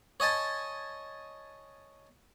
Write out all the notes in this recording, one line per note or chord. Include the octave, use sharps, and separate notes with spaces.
C#5 D#5 G#5 A5